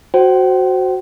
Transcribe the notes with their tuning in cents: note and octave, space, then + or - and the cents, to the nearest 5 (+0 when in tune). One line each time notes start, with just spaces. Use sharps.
F#4 +0 C5 +0 G5 -40